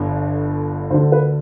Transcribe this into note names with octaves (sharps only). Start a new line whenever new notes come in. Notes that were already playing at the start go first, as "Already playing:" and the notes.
Already playing: G1 G2 D3
D2 D3 C5
B4